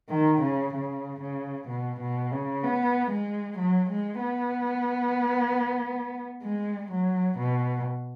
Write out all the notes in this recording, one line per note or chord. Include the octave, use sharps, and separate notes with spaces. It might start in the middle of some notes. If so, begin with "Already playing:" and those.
D#3
C#3
C#3
C#3
B2
B2
C#3
B3
G#3
F#3
G#3
B3
G#3
F#3
B2